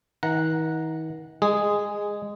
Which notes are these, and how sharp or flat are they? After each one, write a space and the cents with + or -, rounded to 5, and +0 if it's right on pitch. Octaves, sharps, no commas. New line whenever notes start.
D#3 +45 F#5 -10 A#5 +5
G#3 -15 G#4 +0